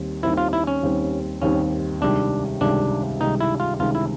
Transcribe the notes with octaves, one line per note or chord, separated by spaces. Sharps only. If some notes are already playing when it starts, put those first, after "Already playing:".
Already playing: D#2 D#3 G3 C4
D#2 D#3 G3 C4 E4
F4
E4
C#4
D#2 D#3 G3 C4
D#2 D#3 G3 C4 C#4
C#2 C3 D#3 G3 D4
C#2 C3 D#3 G3 D4
C#2 C3 D#3 G3 D#4
E4
F4
C#2 C3 D#3 G3 F4
E4